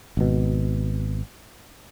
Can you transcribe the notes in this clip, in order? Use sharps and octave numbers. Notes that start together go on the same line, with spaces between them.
G#1 B2